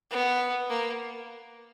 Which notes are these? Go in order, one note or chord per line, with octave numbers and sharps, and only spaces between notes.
B3
A#3